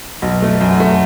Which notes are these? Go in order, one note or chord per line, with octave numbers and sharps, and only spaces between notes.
B1
A3
F#2
A3